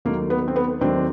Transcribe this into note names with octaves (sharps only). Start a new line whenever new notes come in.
D#2 D#3 F#3 A3 A#3
B3
C4
B3
D#2 D#3 F#3 A3 C4 D4